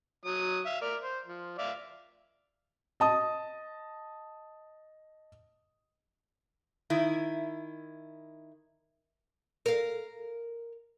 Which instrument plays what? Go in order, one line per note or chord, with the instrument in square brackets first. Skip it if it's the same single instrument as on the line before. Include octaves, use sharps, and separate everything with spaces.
[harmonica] F#3 D#6
E5 F5
A#4 D5
C5
F3
D5 E5 F5
[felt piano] D#5 A5 D#6
[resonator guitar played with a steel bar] D#3 E4
[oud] A#4 F5